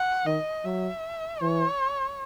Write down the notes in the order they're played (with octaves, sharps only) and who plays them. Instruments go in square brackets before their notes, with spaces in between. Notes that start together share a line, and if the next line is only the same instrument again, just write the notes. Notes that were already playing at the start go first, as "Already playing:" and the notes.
Already playing: [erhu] F#5
[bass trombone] D#3 [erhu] D#5
[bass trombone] F#3 [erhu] E5
[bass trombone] E3 [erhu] C#5